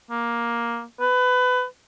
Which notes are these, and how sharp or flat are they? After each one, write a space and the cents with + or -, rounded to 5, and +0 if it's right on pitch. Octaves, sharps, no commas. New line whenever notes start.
A#3 +10
B4 +20